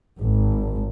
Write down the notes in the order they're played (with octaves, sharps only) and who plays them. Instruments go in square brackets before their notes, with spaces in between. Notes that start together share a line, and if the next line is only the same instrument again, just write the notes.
[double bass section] G#1